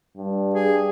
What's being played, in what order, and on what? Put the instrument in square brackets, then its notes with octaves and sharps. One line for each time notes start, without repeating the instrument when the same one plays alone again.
[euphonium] G2
[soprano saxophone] G#4